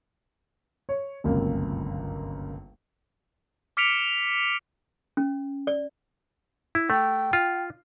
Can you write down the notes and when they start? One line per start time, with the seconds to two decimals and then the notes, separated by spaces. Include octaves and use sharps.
0.89 C#5
1.24 G1 C#2 F#2 C3 A#3
3.77 D6 F6 B6 C#7 D7 F7
5.17 C#4
5.67 D5
6.75 E4
6.90 A3 G5
7.33 F4